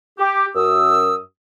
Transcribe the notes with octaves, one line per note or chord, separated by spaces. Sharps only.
G4
F#2 F#4 D#6 E6